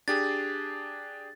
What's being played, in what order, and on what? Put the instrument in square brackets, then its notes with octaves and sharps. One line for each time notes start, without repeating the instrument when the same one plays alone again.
[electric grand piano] D4 G4 G#4 [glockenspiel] A6